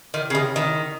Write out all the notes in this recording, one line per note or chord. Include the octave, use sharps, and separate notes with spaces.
D#3
C#3
D#3
D#3